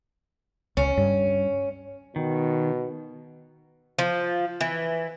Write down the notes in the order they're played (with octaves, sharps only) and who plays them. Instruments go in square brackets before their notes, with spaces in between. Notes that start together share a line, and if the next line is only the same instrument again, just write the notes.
[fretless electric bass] C#2 [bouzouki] C#4
[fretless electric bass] G2
[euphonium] B2 [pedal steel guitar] D#3
[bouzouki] F3
E3